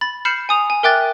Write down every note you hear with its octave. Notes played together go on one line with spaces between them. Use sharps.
B5 A6
B5 F6 G6 C7 C#7 E7
G#5 D#6 F7
G#5
A#4 E5 G5 D6 F#6 A6